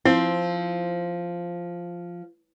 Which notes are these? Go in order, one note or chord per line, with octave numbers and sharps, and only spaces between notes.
F3 C4 E4